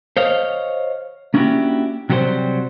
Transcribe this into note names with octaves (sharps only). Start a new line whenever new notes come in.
C5 C#5 D#5 F5
A#3 C#4 D4 E4 F#4 G4
C3 F#3 G3 F#4 G#4 C5